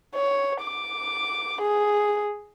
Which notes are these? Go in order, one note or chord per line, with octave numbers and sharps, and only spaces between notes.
C#5
D6
G#4